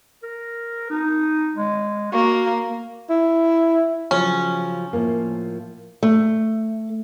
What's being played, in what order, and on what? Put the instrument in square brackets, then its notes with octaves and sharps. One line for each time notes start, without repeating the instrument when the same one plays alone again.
[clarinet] A#4
D#4
G#3
[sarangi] A#3 [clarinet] F#4
[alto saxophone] E4
[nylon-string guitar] C#3 F3 F#3 [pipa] C#4
[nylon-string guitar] A2 F3 A#3
A3